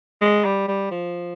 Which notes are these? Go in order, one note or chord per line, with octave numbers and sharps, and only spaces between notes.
G#3
G3
G3
F3